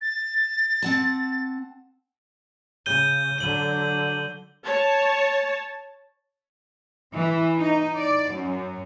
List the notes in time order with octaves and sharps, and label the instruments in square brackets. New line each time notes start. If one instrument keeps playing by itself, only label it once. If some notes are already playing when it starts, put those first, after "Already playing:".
[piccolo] A6
[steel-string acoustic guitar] C4 F#5 A5
[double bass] C#3 [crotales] G6 D#7 G7
[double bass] D3 F#3 [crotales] D#7 F#7
[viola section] C#5 A5
[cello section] E3
D#4
D5
F#2